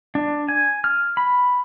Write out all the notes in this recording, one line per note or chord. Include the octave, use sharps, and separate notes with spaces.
D4
G#5
F6
B5